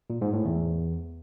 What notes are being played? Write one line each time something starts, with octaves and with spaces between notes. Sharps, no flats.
A#2
G#2
A2
E2